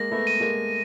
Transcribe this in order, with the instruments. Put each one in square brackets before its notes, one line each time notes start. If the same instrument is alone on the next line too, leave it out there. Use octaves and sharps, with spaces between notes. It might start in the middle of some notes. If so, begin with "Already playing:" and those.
Already playing: [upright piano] G#3 A#3 [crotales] A#6
[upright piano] A3 B3
[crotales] D#7
[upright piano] G#3 A#3